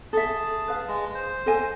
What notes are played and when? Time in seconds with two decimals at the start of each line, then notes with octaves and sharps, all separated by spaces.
0.13 G#4 A4 E5 A5
0.68 B4 F5
0.88 G#3
1.15 C5
1.46 A4 D#5 G#5